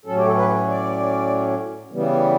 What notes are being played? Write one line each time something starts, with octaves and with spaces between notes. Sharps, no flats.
A2 F#3 C#4 A4
G4
A4
B4
D5
C#3 E3 G3 B3